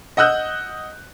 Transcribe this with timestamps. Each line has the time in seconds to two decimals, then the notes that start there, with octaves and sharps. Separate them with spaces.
0.17 D#5 F#5 D#6 E6 F#6 G6